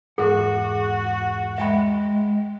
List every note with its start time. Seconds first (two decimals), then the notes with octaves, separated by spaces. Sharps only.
0.18 E2 G#2 F#4 G#4 F#5
1.58 G#3 E5 G5 B5